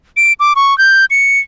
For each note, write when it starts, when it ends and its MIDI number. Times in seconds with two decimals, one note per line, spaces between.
0.17 0.33 98
0.40 0.53 86
0.56 0.76 85
0.78 1.05 91
1.11 1.39 97